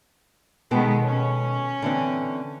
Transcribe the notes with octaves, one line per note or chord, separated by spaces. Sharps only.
B2 D#3 G#3 B3 A4 G5
C#4
D3 E3 C4